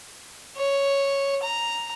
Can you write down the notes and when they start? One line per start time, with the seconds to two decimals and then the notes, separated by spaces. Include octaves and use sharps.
0.57 C#5
1.43 A#5